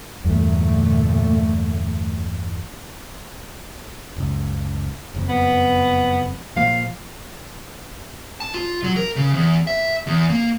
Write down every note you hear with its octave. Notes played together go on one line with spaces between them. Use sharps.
E2 G2 A#2 D3 A3
F#1 C#2
F#1 F2
B3
A#2 F3 A#3 F5
A5
F4
F#3
A#4
C#3
E2
E5
E2
A#3